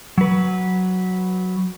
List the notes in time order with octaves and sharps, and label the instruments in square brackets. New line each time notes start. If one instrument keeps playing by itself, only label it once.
[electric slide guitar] F#3 B4